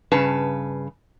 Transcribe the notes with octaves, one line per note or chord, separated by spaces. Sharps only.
G2 C#3 B4 A5